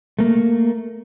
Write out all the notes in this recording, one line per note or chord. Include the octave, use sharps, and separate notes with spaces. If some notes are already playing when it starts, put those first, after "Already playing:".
A3 A#3